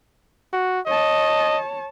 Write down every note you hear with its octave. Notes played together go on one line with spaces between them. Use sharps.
F#4
C#5 D#5 A5